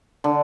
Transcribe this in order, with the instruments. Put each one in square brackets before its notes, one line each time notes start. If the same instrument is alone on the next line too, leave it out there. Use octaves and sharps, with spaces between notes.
[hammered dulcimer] D3